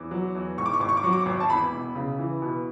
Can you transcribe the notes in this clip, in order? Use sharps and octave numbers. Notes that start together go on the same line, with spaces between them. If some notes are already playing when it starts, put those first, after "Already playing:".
Already playing: E2 D6
F#3
E2
G#2 C#6
D6
C#6
G#1 D6
C#6
D6
F#3 C#6
D6
C#6
G#1
A5
E2 B5
E1
C#3
E3
B2